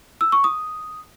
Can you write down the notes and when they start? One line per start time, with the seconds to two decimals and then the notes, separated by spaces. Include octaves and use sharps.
0.21 E6
0.32 C#6
0.44 D#6